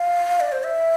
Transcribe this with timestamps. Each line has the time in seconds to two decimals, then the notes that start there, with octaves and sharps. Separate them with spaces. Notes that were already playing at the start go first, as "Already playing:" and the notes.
Already playing: F5
0.40 D5
0.52 C5
0.65 E5